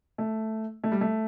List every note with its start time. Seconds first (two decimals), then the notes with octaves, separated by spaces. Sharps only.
0.18 A3
0.84 A3
0.92 G3
1.01 A3